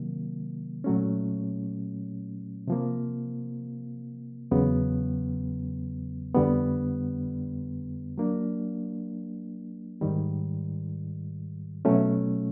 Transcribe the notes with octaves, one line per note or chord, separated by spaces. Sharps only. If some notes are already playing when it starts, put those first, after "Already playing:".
Already playing: C3 D#3 F#3 A#3
A#2 F#3 A3 C#4
C3 F3 A#3
E2 C#3 F#3 B3
F2 D3 G3 B3
F#3 A#3 D4
G#2 D#3 G3
B2 F#3 A3 C#4